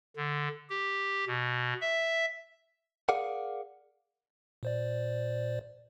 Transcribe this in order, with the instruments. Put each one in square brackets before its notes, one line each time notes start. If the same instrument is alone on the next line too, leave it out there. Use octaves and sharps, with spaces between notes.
[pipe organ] D3
G4
B2
E5
[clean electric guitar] G#4 A#4 D5 F5 F#5
[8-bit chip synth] A#2 C5 D5